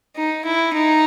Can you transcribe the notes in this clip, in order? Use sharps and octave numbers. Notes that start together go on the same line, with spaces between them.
D#4
E4
D#4